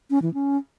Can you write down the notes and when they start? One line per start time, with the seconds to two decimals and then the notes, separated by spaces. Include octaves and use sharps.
0.10 C#4
0.22 E3
0.34 C#4